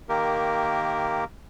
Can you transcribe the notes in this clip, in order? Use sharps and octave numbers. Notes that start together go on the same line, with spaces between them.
D#3 A#3 G4 A#4